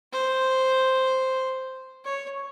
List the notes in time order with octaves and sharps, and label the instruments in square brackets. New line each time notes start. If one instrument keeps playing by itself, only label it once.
[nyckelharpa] C5
C#5